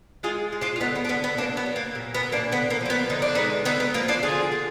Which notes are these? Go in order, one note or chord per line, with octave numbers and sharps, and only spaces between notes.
G#3 F4 G#4
G#3
D4 F4
F4
D3 B3 D#4
B3
D4
D3 B3
B3
F#3 A#3 D4
B3
F#3
A#3
A#2
B3
A#2
A#3 D4
D3 B3
A#3
F3 A#3
B3
D3 D#4
D4
G#3 B3 D#4
D3 B3 D#4
B3
F3 A#3
D4 F4
D3 F4 G#4
G#3